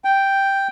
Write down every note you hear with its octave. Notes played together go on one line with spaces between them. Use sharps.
G5